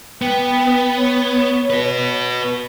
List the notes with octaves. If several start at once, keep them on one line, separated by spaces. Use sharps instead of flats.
B3 G5
C#5
F#4 B4